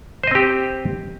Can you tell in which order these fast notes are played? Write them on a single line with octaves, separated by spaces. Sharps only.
C5 D#5 C4 G4